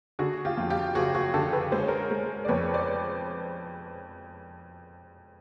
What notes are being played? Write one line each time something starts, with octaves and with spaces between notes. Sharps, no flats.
D3 F#4 G#4
F4 G4
F2
F4 G4
F#1 F#4 G#4
F#4 G#4
D3 G4 A4
A4 B4
G#3 C5
C#5
A#4 C5
G#3
D5
F2 B4 C#5
C5 D5